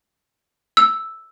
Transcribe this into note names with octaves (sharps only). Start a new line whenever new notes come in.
E6